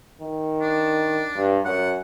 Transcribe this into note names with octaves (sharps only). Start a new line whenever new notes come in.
D#3
D4
G2
F#2 F#5